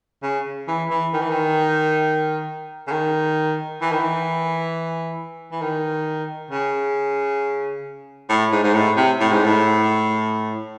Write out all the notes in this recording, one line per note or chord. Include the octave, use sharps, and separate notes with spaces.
C#3
E3
E3
D#3
E3
D#3
C#3
D#3
E3
D#3
E3
E3
D#3
C#3
A2
G#2
G#2
A2
C3
A2
G#2
A2